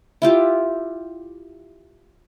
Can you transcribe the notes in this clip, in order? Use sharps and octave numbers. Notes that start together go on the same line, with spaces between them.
E4 F4 G4